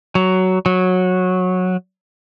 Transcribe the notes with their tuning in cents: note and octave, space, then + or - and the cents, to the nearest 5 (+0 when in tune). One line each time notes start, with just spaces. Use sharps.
F#3 +10
F#3 -15